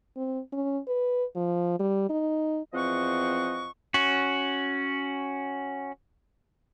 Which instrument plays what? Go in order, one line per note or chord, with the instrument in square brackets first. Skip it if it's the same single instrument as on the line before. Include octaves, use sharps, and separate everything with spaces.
[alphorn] C4
C#4
B4
F3
G3
D#4
[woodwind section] E2 F3 C4 D#5 F#5 C#6
[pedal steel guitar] C#4 F#4